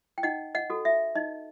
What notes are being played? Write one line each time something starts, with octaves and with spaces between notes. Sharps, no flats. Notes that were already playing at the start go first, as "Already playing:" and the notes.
G5
D#4 D#5 F#5
D#5 F#5
F#4 A4
E5
D#4 D#5